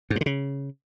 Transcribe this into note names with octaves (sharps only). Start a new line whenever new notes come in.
G#2
G2
D3
C#3